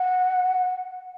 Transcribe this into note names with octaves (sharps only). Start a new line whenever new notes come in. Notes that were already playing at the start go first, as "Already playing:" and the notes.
Already playing: F#5